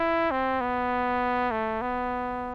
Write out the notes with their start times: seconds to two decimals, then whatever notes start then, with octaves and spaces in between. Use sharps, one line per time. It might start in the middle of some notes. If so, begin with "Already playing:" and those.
Already playing: E4
0.31 C4
0.61 B3
1.51 A3
1.82 B3